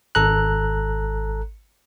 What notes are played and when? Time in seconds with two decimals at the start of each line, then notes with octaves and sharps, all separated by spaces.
0.15 G#1 A4 A#5 F#6